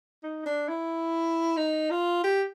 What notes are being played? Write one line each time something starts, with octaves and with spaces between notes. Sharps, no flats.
D#4
D4
E4
D#4
F4
G4